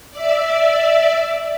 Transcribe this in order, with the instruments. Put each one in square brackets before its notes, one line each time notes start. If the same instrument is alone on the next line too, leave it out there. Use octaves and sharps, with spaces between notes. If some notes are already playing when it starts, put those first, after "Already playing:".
[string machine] D5 E5